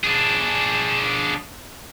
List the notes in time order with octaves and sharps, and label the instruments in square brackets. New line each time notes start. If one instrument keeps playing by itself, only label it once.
[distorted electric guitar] D4 G#4